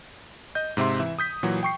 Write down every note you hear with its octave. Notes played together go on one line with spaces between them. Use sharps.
D#5 G6
G#2 C3 C4 E5 C6
E3 E5
D#6 G6 B6
A#2 E3 F#3 F#4
G5 C#6 C7